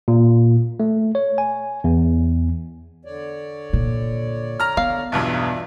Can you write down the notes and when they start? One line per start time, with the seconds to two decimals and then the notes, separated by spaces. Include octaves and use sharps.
0.08 A#2
0.80 A3
1.15 C#5
1.38 G#5
1.84 E2
3.05 D3 C#5 D5
3.73 A#2
4.60 A#5 F6
4.77 B3 F5
5.12 B1 E2 G2 G3 F4 E5